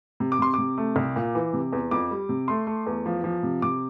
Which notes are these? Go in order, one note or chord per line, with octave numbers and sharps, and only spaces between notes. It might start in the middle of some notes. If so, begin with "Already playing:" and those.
C3
D6
C3 C6
C3 D6
A3
C2
A#2
E3
C3
E2
F2 D6
G3
C3
A3 C6
A3
E2
F3
F3
C3
C3 D6